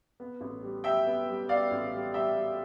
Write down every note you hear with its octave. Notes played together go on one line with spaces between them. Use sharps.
B3
A1
G3
G3 E5 G5
B3
G3
B3 D5 F5
A1
G3
G3 E5 G5
G3